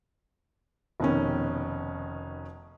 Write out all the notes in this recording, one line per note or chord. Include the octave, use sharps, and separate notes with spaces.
F1 B2 D#3 C#4